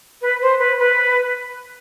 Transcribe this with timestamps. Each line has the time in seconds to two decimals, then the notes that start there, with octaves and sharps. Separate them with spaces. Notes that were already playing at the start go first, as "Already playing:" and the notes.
0.21 B4
0.41 C5
0.59 B4
0.78 B4